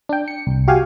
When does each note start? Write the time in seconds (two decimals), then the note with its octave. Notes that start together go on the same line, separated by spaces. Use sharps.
0.09 D4 G5
0.28 C#7
0.47 C2
0.68 F#4 G4 F5 G5 G#5